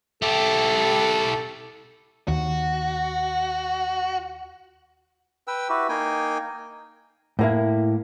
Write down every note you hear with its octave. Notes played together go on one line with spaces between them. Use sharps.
E4 G4 A4
D#2 F#4
B4 G5 E6
E4 F#4 G4 B4
A#3 D#4 G5 G#5
A2 A#3 E4